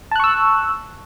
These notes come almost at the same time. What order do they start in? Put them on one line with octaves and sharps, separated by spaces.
A5 F#6 C#6 E6